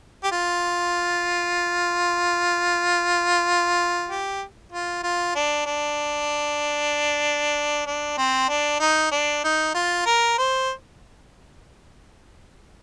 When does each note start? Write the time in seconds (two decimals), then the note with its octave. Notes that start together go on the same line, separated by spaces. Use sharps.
0.24 G4
0.32 F4
4.09 G4
4.72 F4
5.03 F4
5.35 D4
5.66 D4
7.87 D4
8.18 C4
8.49 D4
8.80 D#4
9.12 D4
9.44 D#4
9.75 F4
10.06 A#4
10.38 C5